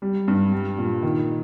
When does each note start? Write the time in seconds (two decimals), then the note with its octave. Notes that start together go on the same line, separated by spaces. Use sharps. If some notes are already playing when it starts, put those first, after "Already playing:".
0.02 G3
0.28 G2
0.52 G3
0.78 A#2
1.03 D#3